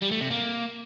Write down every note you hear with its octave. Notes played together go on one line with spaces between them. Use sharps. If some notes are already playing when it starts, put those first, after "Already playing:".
G3
A3
C3
A#3